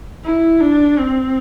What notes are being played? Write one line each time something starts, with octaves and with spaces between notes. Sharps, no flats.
E4
D4
C4